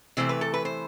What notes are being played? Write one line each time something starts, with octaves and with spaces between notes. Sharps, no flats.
C3 E3 A3 C5
B4
A4
B4
C5